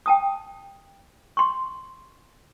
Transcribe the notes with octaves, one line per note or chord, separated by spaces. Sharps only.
G5 A5 D#6
C6 C#6